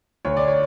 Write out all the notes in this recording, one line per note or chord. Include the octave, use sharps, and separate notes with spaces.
D2 C#5
D5
C#5